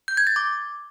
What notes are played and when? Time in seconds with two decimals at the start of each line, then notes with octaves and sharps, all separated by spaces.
0.08 G6
0.17 G#6
0.27 A6
0.36 D6